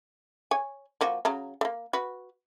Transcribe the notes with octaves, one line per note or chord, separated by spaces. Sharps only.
C#5 G#5
F3 A#3 F#4
C#3 F#3 A#5
A3 A#3
F#4 B4